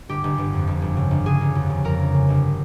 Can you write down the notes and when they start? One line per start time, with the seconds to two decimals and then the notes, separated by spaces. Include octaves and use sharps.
0.09 G1 G4
0.24 G1
0.38 G1
0.53 F2
0.67 G1
0.82 G1
0.97 C#3
1.11 G1
1.26 C#3 G#4
1.41 G1
1.55 F2
1.70 C#3
1.84 F2 A#4
2.00 G1
2.14 C#3
2.29 G1